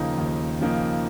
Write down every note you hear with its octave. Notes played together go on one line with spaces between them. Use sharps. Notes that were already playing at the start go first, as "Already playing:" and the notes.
Already playing: D#2 C#3 F3 A#3 D#4
D#2
C#3 F3 A#3 D#4